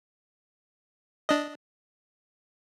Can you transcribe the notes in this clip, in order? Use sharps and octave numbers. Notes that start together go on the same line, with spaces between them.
D4 D#5